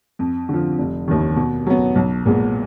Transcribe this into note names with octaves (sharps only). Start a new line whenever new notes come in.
F2
D3 F3
F1
D#2 D#3
B2
F#3 B3
B1
A#2 G#3 B3